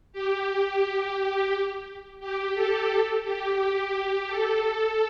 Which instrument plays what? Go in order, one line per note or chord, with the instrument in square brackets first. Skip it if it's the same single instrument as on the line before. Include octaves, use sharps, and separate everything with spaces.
[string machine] G4
G4
A4
A4
G4
G4
A4